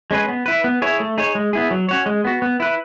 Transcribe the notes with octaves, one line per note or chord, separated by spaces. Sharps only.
G#3 C#4 G#4 B4
B3
E4 B4
B3
E4 G#4 C#5
A3
D#4 G#4 C#5
G#3
B3 E4 G#4
F#3
C#4 F#4 C#5
G#3
B3 F#4
B3
E4 B4